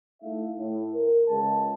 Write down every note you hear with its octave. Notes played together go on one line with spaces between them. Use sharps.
A3 D#4 E4 E5 F5
A2
A#4
C#2 C#3 G#3 A5